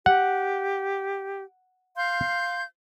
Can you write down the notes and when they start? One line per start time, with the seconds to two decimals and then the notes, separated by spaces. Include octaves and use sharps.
0.06 G4 F#5
1.96 F5 C6 G6